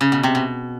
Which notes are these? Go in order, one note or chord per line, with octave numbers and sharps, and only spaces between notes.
C#3
B2
C3
B2